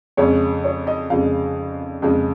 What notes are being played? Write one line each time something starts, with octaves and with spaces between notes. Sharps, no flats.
F2 C#3 G#3 C#5
C#5
D#5
F2 C#3 G#3 F5
F2 C#3 G#3